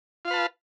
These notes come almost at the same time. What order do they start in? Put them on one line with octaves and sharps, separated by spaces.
F4 F5 B4 A5